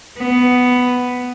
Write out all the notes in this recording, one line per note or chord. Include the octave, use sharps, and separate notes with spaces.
B3